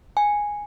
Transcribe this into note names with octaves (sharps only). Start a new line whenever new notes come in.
G#5